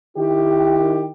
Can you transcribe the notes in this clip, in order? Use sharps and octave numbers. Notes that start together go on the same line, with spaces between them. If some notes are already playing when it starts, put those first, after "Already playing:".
D#3 E4 G4